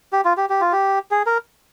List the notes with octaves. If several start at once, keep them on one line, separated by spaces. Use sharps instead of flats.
G4
F4
G4
G4
F4
G4
G#4
A#4